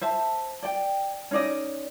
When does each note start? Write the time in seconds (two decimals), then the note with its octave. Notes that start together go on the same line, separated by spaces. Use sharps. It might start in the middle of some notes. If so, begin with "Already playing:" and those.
0.01 C5 E5 A5
0.63 D5 G5
1.31 C#4 D#4 D5 D#5